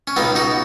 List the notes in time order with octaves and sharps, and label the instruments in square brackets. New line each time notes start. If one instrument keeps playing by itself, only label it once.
[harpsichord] C#4
C#2 B2 B3 D#4
D#4 F#4